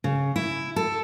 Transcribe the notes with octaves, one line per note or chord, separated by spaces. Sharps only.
C#3
E4
A4